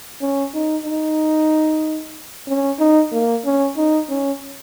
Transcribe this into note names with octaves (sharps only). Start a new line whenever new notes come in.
C#4
D#4
D#4
C#4
D#4
A#3
C#4
D#4
C#4